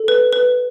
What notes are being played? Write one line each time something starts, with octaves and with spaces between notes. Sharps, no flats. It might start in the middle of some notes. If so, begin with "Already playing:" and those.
Already playing: A4
B4
B4